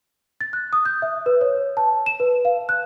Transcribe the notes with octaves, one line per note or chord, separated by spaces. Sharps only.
A6
F#6
D#6
G6
E5
B4
C#5
A5
E7
B4
F5
F#6